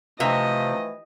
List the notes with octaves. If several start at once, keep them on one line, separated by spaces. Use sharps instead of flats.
C3 E3 F3 A3 D#5